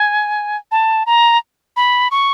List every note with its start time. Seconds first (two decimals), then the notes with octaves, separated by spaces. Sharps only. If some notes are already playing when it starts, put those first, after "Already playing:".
Already playing: G#5
0.71 A5
1.06 A#5
1.76 B5
2.11 C#6